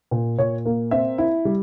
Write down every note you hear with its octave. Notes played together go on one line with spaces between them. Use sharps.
A#2
A#2 C#5
A#3
C4 E5
E4
G3